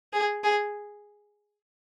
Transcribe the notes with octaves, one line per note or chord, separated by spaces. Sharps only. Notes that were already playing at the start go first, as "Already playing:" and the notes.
G#4
G#4